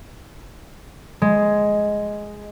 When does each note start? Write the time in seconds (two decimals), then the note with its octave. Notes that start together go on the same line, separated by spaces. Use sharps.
1.22 G#3